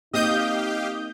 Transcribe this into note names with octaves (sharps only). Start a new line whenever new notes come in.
A#3 C4 D#4 G4 D#5 F5 D#6 G6